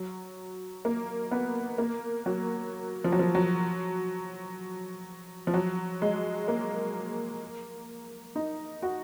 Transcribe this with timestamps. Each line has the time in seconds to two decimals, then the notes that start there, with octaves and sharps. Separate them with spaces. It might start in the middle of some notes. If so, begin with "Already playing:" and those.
Already playing: F#3
0.85 A#3
1.31 B3
1.78 A#3
2.26 F#3
3.04 F3
3.12 F#3
3.19 F3
3.35 F#3
5.47 F3
5.54 F#3
6.02 G#3
6.48 A#3
8.36 D#4
8.82 F#4